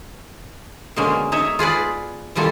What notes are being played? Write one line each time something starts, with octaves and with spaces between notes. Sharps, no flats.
B2 D3 G#3 A#3 C#4
D#4 C#5 E5
F4 G#4 B4 D5
B2 E3 G3 A#3 F4 A4